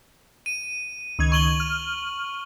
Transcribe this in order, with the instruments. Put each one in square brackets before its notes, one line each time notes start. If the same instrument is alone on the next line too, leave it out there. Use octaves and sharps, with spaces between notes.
[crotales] D#7
[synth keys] C#2 D#3 G#6
[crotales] C#6 F#7 G7
[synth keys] F6